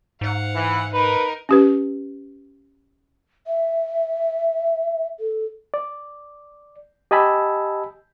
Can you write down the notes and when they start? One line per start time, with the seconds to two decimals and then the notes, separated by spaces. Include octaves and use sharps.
0.21 G#2 F5 F#5
0.55 E3
0.94 D#4 A#4 B4
1.49 C#4 G4 B4
3.47 E5
5.19 A4
5.74 D5
7.11 G4 D#5 G#5 A5 B5 E6